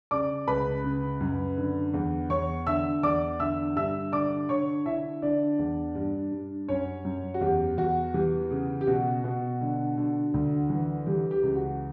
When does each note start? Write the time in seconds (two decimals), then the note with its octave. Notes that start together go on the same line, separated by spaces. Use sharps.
0.11 C#3 D5 D6
0.48 C#2 B4 B5
0.84 C#3
1.20 F#2
1.57 D3
1.94 E2
2.30 E2 C#5 C#6
2.67 D3 E5 E6
3.03 E2 D5 D6
3.40 D3 E5 E6
3.76 G2 E5 E6
4.12 D3 D5 D6
4.49 D3 C#5 C#6
4.86 D3 E4 E5
5.22 D3 D4 D5
5.59 E2
5.95 G2
6.32 G2
6.69 F#2 C#4 C#5
7.05 F#2
7.34 F#4
7.41 E2 G4
7.78 E2 F#4
8.14 E3 G4
8.51 C#3
8.81 G4
8.87 B2 F#4
9.24 B2
9.61 D3
9.97 D3
10.34 D2
10.70 E3
11.06 E3 G4
11.31 G4
11.43 C#2
11.55 F#4